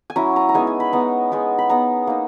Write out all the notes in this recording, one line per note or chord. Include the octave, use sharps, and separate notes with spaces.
G#5
F#3 C#4 E4 A#5
A#5
A#5
G#3 B3 D#4 G#5
G#5
B5
G#3 B3 D#4 A#5
G#3 B3 D#4
B5
G#3 B3 D#4 A#5
A#3 D#4